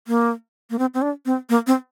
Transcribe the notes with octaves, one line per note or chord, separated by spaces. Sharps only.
A#3
A#3
C4
C4
D4
C4
A#3
C4